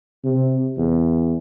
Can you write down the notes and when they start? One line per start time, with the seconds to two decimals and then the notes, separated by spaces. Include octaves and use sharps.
0.24 C3
0.77 E2